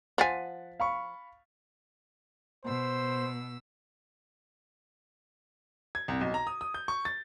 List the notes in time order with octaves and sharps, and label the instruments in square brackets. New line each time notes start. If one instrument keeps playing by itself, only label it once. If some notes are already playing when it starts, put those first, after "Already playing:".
[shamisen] F3 G#5 [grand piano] F#5 A6 B6
[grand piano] F5 B5 C#6
[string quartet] B2 E6 [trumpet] C5
[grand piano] G#6
C2
B1
A#5
D#6
D#6
G6
C#6
A6